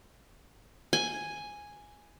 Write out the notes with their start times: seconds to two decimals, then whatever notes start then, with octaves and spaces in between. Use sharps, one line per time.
0.93 G#5